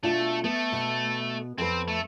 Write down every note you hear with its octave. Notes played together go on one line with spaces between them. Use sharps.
B2 A3 D4 F4
A3 B3
B2
F2 C4 B4
A3